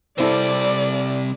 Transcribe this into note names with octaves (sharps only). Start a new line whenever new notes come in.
C3 G3 C4 E4 A4 D5